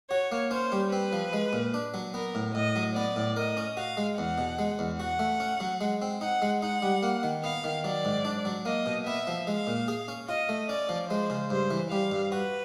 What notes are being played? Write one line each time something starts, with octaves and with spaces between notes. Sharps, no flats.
F#4 C#5
A#3
C#4 C5
G3
C4 B4
F3
G#3
A#2
D4
F#3
B3 A#4
A2
A2 D#5
F#3
B3 D5
A2
A#4 D#5
C#4
F#4 F5
G#3
E2 F#5
B2
G#3
E2
F#4 F#5
A3
C#4
F#3
G#3
C4
D#4 F#5
G#3
D#4 F#5
G3
A#3
D#3
B3 F5
D#3
F#3 D5
G#2
D4
F#3
A#3 D#5
B2
B3 E5
F3
G#3 F5
A#2
G#4
C#4
F4 D#5
A3
C#4 D5
F3
G#3 C5
C#3
G2 C5
E3
G3 F5
G2
F#4 B4